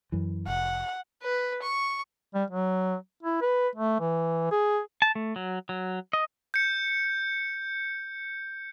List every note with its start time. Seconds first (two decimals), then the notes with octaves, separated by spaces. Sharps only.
0.12 F#2 E3
0.48 F1 F#5
1.22 B4
1.62 C#6
2.34 G3
2.50 F#3
3.23 E4
3.41 B4
3.75 A3
4.00 E3
4.51 G#4
5.02 A5
5.15 A3
5.36 F#3
5.69 F#3
6.13 D#5
6.54 G6 C#7